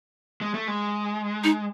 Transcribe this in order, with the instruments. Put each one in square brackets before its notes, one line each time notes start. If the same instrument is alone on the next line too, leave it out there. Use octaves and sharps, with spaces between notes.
[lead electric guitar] G#3
A3
G#3
[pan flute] D#4